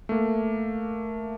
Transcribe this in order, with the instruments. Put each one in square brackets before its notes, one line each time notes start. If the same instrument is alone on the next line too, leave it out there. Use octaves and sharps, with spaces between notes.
[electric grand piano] A3 A#3